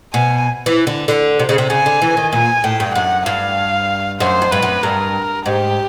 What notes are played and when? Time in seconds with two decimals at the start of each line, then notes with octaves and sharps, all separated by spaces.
0.14 B2 G#5
0.66 E3
0.87 D3
1.08 D3
1.39 C3
1.49 C#3
1.58 C3
1.70 C#3 G#5
1.86 D3
2.02 E3
2.17 D#3
2.33 A#2 G#5
2.64 A2 G5
2.80 G2
2.95 F#2 F#5
3.26 G2 F5
4.20 F#2 C5
4.42 F2
4.52 G2 B4
4.62 F#2
4.83 G2 A#4
5.46 G#2 G4